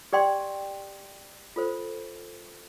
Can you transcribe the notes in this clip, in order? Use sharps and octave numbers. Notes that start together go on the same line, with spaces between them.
G4 D5 G5 C6
F4 A4 C5